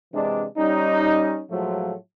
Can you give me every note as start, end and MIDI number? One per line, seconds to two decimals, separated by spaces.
0.13 0.44 48
0.13 0.44 52
0.13 0.44 56
0.13 0.44 62
0.57 1.42 55
0.57 1.42 61
0.57 1.42 63
1.51 1.94 45
1.51 1.94 53
1.51 1.94 54
1.51 1.94 56
1.51 1.94 57
1.51 1.94 65